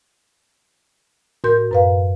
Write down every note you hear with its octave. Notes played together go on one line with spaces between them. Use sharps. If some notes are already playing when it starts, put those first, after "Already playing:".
A2 F#4 A#4 C6 G6
F#2 B4 F5